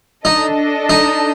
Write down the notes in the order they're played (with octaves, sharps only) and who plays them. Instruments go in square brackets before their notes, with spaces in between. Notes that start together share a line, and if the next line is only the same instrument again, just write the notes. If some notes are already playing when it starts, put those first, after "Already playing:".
[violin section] D4 A4 D#5 [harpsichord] D#4
[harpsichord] D#4